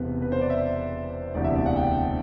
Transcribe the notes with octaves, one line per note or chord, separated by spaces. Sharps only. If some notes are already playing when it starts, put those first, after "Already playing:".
Already playing: E1 E2 C3 E3 B4
B4
C5
D5
E5
E1 D2 C3 E3 D5
E5
D5
F#5
G5